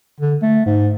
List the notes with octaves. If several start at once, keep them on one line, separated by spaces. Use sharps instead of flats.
D3
A3
G#2